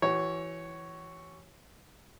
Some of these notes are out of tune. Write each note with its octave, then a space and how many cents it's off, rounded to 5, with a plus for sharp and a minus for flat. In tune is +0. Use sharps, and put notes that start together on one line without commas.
E3 +15 F#4 +45 C#5 +0